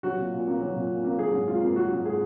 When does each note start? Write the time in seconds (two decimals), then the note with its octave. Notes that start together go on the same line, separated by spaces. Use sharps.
0.03 F#3 F#4
0.18 A#2
0.33 A#2
0.46 A#3
0.61 F#3
0.76 A#2
0.90 A#2
1.04 A#3
1.19 F#3 G#4
1.33 G#2
1.48 G#2 F4
1.63 A#3
1.76 F#3 F#4
1.91 G#2
2.05 G#4